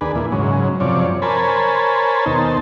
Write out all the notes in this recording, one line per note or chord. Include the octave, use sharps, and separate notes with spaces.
D#2 D4 G#4 B4
A#2 E3
G#2 C#3 F#3
F#2 C3 F3 C#5 D5
A#4 C5 C#5 G#5 A5 B5
D#2 B2 D#4 C5 A5